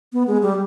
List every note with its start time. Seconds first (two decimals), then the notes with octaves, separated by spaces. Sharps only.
0.13 B3
0.28 G#3
0.43 G3